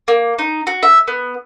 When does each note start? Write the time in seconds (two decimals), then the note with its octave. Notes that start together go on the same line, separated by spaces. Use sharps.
0.08 A#3
0.39 D#4
0.67 F#4
0.83 E5
1.08 B3